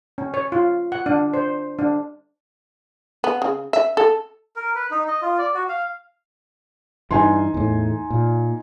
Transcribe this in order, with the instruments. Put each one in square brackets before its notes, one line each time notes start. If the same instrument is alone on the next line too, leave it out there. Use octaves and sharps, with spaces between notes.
[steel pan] C#4
C#5
F4
F#5
D4
C5
D4
[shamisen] B3
C#3
E5
A4
[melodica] A#4
B4
D#4
D#5
F4
D5
F#4
F5
[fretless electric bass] G2 E3 [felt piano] D#4 G#5 C6
[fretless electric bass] E2 A2
A#2